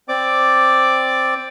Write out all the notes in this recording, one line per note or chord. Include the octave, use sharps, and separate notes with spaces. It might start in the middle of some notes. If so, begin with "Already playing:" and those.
C4 D5 D6